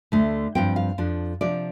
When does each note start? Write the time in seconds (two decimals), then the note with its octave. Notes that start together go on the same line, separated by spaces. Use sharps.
0.12 D2 D3 A3
0.55 G2 F3 C4 G5
0.76 F5
0.98 F2 F3 D4
1.41 C3 F3 D4 D5